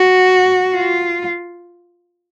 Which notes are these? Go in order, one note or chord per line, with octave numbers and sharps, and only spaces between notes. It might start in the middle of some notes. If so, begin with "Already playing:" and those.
Already playing: F#4
F4